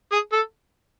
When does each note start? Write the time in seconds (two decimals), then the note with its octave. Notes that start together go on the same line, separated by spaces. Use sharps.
0.12 G#4
0.32 A4